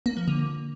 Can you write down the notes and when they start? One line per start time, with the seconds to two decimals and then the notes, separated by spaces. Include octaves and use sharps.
0.06 A#3
0.17 F3
0.28 D3